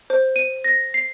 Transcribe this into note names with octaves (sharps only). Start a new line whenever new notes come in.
C5
D#7
A#6
C7